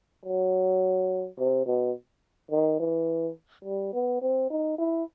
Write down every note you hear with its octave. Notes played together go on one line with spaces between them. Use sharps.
F#3
C3
B2
D#3
E3
G3
B3
C4
D#4
E4